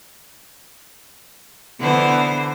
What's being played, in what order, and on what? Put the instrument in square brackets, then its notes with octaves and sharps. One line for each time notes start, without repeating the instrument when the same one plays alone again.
[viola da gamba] D3 E3 C5 [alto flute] B3